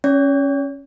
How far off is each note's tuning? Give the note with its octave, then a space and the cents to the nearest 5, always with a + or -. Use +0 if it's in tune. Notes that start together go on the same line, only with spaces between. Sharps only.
C#4 -5 C#5 +40